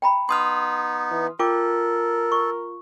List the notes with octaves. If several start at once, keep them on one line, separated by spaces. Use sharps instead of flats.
G5 A#5 B5
B3 D#4 C6 D#6 F6
E3
F4 A4 A#4 G5 D6
C#6